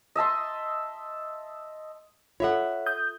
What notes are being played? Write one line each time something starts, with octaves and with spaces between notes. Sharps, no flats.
D#5 E5 A5 C6
F4 A4 C#5 E5 F#5
D#6 G6